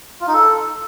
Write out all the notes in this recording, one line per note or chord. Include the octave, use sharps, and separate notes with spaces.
F4
D#4
A4